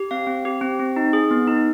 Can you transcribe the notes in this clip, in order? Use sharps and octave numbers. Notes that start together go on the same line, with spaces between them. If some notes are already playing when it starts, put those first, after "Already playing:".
Already playing: G4
C4 F5
C4
G4
C4
C4
D#4
G#4
B3
D#4